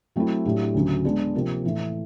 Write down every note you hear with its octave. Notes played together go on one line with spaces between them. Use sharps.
F#3 A3 C4 E4
A2 F#3 A3 D4 G4
D2 C#3 F#3
G#3 B3 D4
C3 F3 A#3
A2 E3 A3